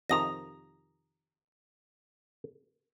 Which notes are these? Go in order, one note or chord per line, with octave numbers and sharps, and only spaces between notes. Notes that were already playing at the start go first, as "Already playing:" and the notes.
F2 C3 D#3 A#5 D#6 A#6